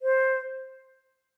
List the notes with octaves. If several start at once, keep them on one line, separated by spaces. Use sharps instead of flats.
C5